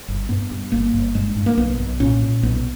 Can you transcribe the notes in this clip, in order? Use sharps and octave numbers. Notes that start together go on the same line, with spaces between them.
G1
G2 B3
G2
G1 A#3
G1
G2 G#3
G2
A#3
B1 B3
B1
A#2 C#4
A#2
B1 B3